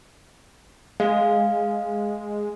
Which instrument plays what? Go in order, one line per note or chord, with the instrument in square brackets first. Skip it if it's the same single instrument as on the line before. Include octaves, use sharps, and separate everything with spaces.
[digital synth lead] G#3 [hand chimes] F5